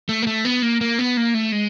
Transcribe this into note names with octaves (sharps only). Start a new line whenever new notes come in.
A3
A#3
A3
B3
A#3
A#3
B3
A#3
A3
G#3